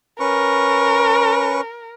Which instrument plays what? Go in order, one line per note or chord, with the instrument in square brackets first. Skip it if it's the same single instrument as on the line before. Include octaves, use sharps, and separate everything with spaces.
[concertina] C#4 B4 C#6 [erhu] A#4